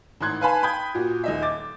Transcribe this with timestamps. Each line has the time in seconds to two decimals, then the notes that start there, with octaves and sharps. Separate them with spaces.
0.21 G#1 A2 C6 F#6 G#6
0.41 B4 F5 G#5 A5 B5 C6
0.63 G5 B5 D#6 G6 G#6
0.95 A#2 F#4
1.24 D#1 D#5 E5
1.42 D6 A6